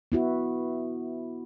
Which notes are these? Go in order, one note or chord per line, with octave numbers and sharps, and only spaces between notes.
B3 E4 F#4